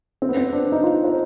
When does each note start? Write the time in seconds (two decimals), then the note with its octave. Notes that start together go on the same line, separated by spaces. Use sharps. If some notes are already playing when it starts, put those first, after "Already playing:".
0.22 C4
0.29 B3
0.37 C4
0.53 D4
0.72 D#4
0.84 F4
1.04 C5